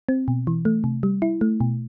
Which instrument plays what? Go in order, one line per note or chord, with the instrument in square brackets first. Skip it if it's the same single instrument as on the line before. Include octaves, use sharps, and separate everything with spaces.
[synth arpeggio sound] C4
B2
E3
A3
C3
G3
E4
A3
B2